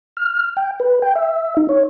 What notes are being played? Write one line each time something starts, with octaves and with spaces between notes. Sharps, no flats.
F6
G5
B4
G5
E5
D#4
C#5